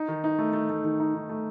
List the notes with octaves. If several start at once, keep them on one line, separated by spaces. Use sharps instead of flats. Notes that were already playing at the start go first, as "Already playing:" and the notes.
Already playing: D#4
D#3
D#4
A3
A3
A3
D#3
D#4
D#3
A3